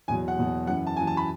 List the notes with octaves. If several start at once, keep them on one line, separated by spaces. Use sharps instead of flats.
E2 B2 F#3 G#5
F#5
E2 B2 F#3
F#2 E3 F#5
A5
F#2 E3 G#5
A5
B5